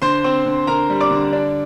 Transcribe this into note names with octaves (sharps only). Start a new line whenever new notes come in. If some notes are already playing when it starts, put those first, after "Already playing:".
D3 C5 C6
C4
D3
D3 A#4 A#5
G3
D5 D6
D3
D4